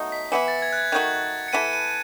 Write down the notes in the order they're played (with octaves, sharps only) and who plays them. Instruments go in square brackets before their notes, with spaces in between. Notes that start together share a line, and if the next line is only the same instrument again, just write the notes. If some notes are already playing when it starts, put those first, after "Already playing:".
Already playing: [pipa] B2 F#3 A3 D#4
[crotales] B6
[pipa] E3 B3 E4 [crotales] C#7
[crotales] A6
G#6
F#6
G#6
[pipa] D#3 A3 D#4 F#4 [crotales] G#6
[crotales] C#7
[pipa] E3 B3 E4 A4 [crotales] D#7
[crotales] D#7